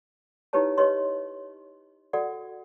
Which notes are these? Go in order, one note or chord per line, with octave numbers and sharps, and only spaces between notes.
D#4 E4 G4 B4 C#5 A5
G4 B4 C#5 D#5 C6
F#4 A4 D5 F#5